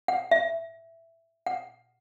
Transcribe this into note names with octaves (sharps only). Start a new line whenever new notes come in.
F#5
E5
F#5